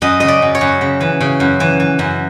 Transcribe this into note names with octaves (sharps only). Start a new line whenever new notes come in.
F#2 D#5
C#3 D#5
D5
F#2
C#5
F#2
C#3
E3
C#3
F#2
E3
E3
F#2